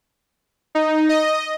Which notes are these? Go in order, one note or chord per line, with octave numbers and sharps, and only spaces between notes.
D#4
D#5